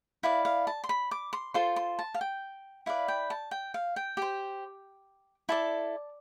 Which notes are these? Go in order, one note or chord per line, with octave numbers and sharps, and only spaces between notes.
E4 B4 D5 F5
F5
A5
C6
B5
D6
C6
F4 A4 C5 C6
C6
A5
F5
G5
E4 B4 D5 F5
G5
A5
G5
F5
G5
G4 C5
E4 A4 D5 A5